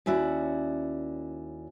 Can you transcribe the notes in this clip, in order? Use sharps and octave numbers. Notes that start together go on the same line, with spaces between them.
D#2 C#4 E4 F#4 D5